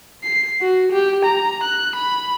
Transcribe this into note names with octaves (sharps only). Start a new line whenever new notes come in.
C7
F#4
G4
A#5
F#6
B5